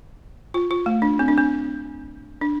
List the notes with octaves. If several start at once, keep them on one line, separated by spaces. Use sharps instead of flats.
F4
F4
A3
D4
C4
D4
C4
D4